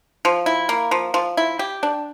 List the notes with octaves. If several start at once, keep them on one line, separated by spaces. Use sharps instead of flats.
F3
E4
A#3
F3
F3
E4
G4
D4